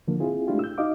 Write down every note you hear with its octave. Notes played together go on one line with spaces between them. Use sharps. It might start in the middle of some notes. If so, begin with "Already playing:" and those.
D3 F3 A#3
C4 E4 F4 G#4
G#3 A3 D4 E4 F4 G4
E6 G6
D#4 F#4 D#5 F5 D6